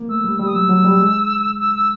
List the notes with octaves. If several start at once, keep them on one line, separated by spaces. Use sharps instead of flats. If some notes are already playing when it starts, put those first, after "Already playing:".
Already playing: A#3
A3 E6
G3
G3 E6
D#6
F#3 E6
F#3
G3
G#3
E6
E6